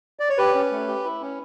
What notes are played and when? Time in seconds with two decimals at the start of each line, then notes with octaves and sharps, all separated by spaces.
0.20 D5
0.29 C#5
0.38 G4 B4
0.54 C#4
0.71 A3
0.88 G4
1.04 E4
1.21 C#4